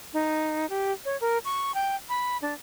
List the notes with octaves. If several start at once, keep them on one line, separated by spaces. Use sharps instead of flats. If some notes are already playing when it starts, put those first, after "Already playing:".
D#4
G4
C#5
A#4
C#6
G5
B5
D4